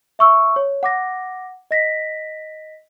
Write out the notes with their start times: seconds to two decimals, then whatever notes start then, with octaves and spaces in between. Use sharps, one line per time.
0.19 E5 C#6 E6
0.56 C#5
0.83 F#5 D6 A#6
1.71 D#5 A#6 B6